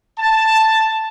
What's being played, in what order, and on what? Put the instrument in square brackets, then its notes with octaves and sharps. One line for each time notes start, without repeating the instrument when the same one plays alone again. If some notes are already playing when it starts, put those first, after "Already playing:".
[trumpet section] A5